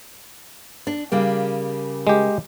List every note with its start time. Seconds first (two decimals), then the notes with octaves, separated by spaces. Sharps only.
0.87 D4
1.12 C#3 G3 A#3
2.07 G#3 G4